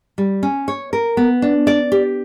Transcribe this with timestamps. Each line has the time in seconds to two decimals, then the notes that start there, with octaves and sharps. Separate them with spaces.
0.18 G3
0.43 C#4
0.68 C#5
0.93 A#4
1.17 B3
1.42 D4
1.67 D5
1.92 G4